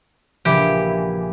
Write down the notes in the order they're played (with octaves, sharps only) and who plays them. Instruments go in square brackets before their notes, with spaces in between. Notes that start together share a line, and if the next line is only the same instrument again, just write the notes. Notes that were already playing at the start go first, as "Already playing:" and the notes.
[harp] A#1 C#3 D6 [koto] E3 G4